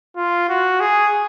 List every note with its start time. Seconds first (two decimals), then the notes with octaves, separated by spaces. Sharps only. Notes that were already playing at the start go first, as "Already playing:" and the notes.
0.17 F4
0.49 F#4
0.80 G#4